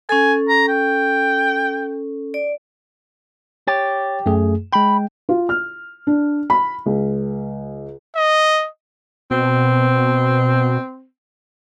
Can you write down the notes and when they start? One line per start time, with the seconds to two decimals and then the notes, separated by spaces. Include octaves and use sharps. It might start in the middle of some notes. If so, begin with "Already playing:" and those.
0.09 C#4 A4 G#5
0.49 A#5
0.68 G5
2.34 D5
3.68 G4 C#5 A6
4.26 F#2 A3 G#4
4.73 G#3 G5 B5
5.29 F4
5.49 F6
6.07 D4
6.50 B5
6.86 C#2
8.16 D#5
9.31 B2 C4